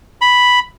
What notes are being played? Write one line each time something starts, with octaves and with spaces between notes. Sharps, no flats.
B5